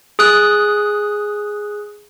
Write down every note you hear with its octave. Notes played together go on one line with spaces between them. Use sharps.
G#4 D#6 F#6